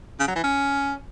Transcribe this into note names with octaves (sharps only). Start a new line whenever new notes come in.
C#3
F#3
E3
C#4